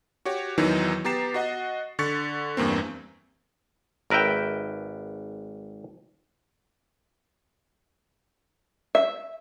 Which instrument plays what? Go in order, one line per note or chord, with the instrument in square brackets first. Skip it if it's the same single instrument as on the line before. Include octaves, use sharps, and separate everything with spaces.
[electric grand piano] F#4 G4 C#5
E2 D#3 E3 F#3 D#4 E4
B3 G4 A#5 A6 C7 E7
F#4 D#5 F#5
D3 C#6 A6 B6 C#7
E2 G2 A#3 C4
[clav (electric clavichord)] G#1 A#4 B4 E5 G5
[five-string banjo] E5